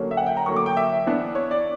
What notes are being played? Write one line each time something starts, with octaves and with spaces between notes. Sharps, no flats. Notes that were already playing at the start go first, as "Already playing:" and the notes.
Already playing: D3 F#3 A#3 C#4
E5
F#5
G5
A#5
D3 F#3 A#3 C#6
D6
G5
E5
E3 B3 D4
C#5
D5